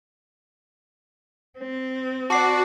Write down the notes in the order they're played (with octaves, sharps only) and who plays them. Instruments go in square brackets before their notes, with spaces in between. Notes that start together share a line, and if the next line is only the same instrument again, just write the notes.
[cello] C4
[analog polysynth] F#4 D5 [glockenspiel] A5 D6 C7